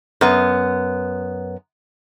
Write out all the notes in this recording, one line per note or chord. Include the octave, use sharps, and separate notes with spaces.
F#2 B3